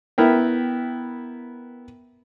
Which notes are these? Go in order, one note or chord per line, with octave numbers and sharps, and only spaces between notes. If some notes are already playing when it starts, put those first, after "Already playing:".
B3 E4 A#4 G5